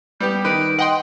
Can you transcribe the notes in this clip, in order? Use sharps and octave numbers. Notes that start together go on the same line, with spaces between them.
G3 B3 G4 G6
D#3 B4 D7
D#5 F#5 G5 C6